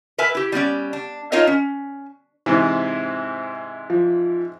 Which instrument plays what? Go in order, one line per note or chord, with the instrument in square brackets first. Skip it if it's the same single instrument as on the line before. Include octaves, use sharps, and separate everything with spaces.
[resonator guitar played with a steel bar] A#4 B4 E5 G#5
E4 G4
G3 B3 C#4 D5
D4
D4 D#4 F4 A#4 C#5 D#5
C#4
[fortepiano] G#2 C3 E3 [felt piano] C4
[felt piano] F3